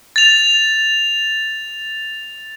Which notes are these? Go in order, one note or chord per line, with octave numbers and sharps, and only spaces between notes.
A6 F7